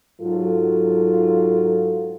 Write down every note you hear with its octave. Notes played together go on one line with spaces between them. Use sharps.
G#2 F#3 F4 A4